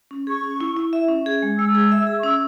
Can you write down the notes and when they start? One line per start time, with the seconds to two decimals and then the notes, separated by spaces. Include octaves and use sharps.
0.11 C#4
0.27 G#4 C#6
0.43 C#4
0.61 E4
0.77 E4
0.93 E5
1.09 C#4
1.26 G#4
1.42 G#3
1.58 G#3 E6
1.75 G#4
1.92 E5
2.07 G#4
2.19 C#6
2.23 C#4 E6